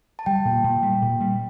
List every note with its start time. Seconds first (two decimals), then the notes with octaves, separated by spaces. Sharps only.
0.19 A5
0.26 G3 G5
0.45 A#2
0.64 A#2
0.83 G3
1.02 A#2
1.20 G3